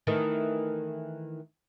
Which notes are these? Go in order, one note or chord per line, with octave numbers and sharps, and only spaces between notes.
D#3 E3 A3